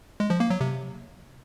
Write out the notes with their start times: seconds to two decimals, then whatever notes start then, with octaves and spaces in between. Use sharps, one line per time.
0.20 G#3
0.30 F3
0.40 A#3
0.50 F#3
0.60 C3